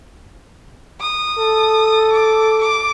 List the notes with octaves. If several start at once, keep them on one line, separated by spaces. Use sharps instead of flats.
D#6
A4
D6
D6